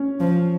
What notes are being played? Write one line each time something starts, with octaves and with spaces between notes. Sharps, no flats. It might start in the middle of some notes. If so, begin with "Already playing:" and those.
Already playing: C#4
F3